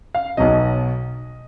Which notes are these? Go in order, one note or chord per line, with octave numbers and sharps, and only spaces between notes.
F5
B1 B2 F#3 D#5